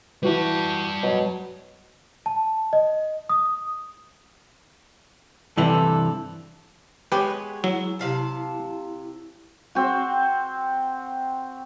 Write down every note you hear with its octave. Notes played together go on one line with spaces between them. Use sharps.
E3 G3 F#4 B4 A5
B2 F#3
A5
D#5
D#6
G2 C3 E3 A4
G#3 B3 G4 B4 C#5
F#3 E4
C3 F5 A5
C4 F#4